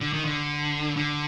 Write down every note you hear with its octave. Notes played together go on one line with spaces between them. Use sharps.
D3
D#3
D3
D3